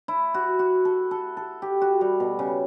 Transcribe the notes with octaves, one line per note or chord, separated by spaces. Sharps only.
E4
F#4
F#4
A4
A4
A4
G4
F#4
G3
B2
C#3